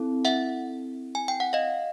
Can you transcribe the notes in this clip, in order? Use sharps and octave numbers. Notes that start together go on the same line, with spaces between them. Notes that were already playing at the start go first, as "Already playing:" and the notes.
Already playing: C4 E4 A4
E5 F#5
G#5
G5
F#5
D#5 F5